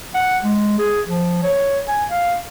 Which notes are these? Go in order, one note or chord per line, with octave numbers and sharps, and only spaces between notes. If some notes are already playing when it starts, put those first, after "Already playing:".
F#5
G#3
G#4
F3
C#5
G#5
F5